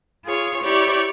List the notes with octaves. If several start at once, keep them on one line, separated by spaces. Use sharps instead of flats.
F4 G#4 C#5
E4 G4 C#5 D5